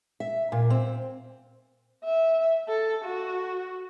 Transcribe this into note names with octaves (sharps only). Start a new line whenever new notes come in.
E5
A#2
C4
E5
A4
F#4